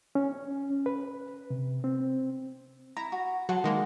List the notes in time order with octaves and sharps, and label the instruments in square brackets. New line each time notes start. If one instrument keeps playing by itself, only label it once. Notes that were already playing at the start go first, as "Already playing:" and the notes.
[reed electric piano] C#4
B4
C3
C4
[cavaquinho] E4 [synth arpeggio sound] A#5
[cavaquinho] F#4
[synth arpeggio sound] F#3 [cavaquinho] F#5 A5 C6
[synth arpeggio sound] D#3 G#3 A#3